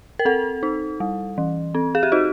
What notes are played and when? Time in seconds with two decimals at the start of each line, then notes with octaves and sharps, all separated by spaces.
0.19 A#4
0.25 C4 A4
0.63 D#4
1.00 G3
1.38 E3
1.75 C4
1.95 G#4
2.03 G4
2.12 D#4 F#4